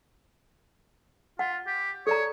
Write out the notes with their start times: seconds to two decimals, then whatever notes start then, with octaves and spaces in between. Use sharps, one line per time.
1.39 F4 F#5
1.67 G4
2.07 A4 C#5 D5 A#5